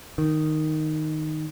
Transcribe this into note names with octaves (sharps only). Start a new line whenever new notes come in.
D#3